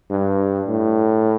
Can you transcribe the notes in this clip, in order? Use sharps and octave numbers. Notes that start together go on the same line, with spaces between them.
G2
A2